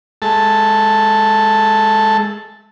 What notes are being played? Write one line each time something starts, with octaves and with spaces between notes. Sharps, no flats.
G#3 A4 A5